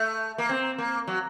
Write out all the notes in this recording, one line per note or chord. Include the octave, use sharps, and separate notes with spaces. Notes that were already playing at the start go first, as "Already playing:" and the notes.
Already playing: A3
A#3
C4
A#3
F#3